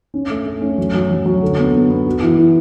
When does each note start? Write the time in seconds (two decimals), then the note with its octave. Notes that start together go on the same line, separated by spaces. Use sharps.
0.14 C#4
0.30 A3
0.46 A3
0.62 C#4
0.78 F#3
0.94 F#3
1.10 F#3
1.26 F#3
1.42 D3
1.58 B3
1.74 B3
1.90 B3
2.07 F#4
2.23 E3
2.38 E3